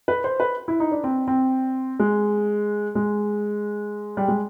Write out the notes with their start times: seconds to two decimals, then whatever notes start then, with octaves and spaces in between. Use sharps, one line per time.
0.08 B4
0.24 C5
0.40 B4
0.68 E4
0.80 D#4
0.92 D4
1.04 C4
1.28 C4
2.00 G#3
2.95 G#3
4.17 G3
4.28 G#3